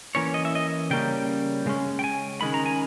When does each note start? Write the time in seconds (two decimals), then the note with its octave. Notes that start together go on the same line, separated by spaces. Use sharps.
0.15 E3 A#3 C#4 C#5
0.34 D#5
0.45 E5
0.55 D#5
0.90 C#3 G3 A#3 C#4 G5
1.66 C#3 G#3 C#4
1.99 G5
2.04 G#5
2.41 D#3 G#3 C#4 B5
2.54 A#5
2.66 G#5